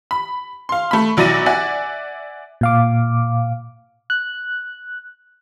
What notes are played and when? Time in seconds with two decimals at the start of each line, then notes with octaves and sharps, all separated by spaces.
0.11 B5
0.69 F5 C6
0.91 A3 B5
1.17 B1 F#3 E4 D5 A#6 D#7
1.46 D5 E5 F#5 G#5
2.61 A#2 F5 D6
4.10 F#6